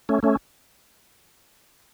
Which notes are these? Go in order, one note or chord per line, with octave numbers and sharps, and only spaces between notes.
A3 C#4
A3 C#4